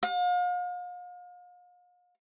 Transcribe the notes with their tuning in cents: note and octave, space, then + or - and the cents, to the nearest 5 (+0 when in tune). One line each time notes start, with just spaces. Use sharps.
F5 +40